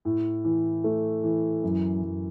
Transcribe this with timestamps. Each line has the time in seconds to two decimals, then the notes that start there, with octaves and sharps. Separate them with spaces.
0.05 A2
0.45 E3
0.84 A3
1.24 E3
1.63 F#2
2.02 F#2